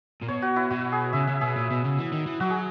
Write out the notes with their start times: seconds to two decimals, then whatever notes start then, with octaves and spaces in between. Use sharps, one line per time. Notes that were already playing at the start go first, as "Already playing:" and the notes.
0.22 A#2
0.28 B2 C#5
0.42 F#4
0.56 E4
0.70 B2 F#4
0.92 G#4
1.13 C#3 E5
1.27 C#3 E5
1.41 B2 G#4
1.56 A#2
1.70 B2
1.84 C#3
1.99 E3
2.12 D#3
2.27 E3
2.40 F#3 F#4
2.50 G#4